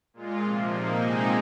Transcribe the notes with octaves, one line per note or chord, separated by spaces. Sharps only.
A#2 G#3 F4
C3 F3 A#3
A#2 A#3 D#4
C3 G#3 C4 D#4 G#4